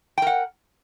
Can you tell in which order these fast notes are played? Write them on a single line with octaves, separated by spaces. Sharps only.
G5 A#4 F#5